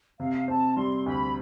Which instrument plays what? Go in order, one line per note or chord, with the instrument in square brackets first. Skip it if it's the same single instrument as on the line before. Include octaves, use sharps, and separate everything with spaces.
[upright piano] C3 [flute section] F5
[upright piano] C4 [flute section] A5
[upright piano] G3 [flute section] C6
[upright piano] D2 [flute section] B5